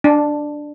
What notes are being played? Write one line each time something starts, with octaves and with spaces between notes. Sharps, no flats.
D4